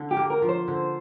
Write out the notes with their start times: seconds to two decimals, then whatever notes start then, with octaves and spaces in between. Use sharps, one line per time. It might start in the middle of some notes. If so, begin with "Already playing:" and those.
Already playing: D3
0.11 G4
0.17 A#3
0.30 A#4
0.42 F3
0.49 C5
0.68 D3